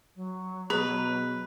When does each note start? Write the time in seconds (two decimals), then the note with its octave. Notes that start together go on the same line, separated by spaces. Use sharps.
0.15 F#3
0.70 B2 G#4 B4 A#5